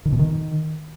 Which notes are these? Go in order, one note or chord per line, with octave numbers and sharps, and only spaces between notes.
D#3
B2
D#3